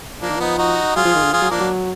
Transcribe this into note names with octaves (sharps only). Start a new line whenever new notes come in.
F3 A#3 D4
D#3
F3 B3 D#4
D#4 F#4
F#3 F4 G#4
F3
D#3
D3
F3 F4 G#4
F#3
F3 A#3 D4
F#3